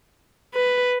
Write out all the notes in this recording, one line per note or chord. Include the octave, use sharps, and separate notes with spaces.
B4